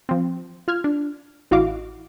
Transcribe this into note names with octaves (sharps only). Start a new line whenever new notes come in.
F3 C4
F4 F6 G#6
D4
A1 E4 F#4 D#5 F5 D6